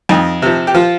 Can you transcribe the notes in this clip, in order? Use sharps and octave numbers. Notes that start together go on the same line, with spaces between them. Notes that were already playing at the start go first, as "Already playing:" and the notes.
F2 D#4
C3 F3
G4
F3 F4